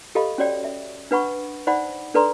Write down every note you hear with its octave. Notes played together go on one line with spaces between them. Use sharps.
G4 A4 D#5 F5 B5
C#4 F#4 C#5 D5 G5
E5
D4 B4 F#5 B5 C#6
D#4 C5 D5 F#5 B5
D4 A4 B4 D5 A#5 C6